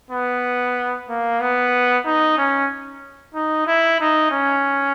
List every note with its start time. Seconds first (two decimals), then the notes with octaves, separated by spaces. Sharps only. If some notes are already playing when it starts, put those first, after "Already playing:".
0.11 B3
1.09 A#3
1.41 B3
2.06 D#4
2.38 C#4
3.35 D#4
3.67 E4
4.00 D#4
4.32 C#4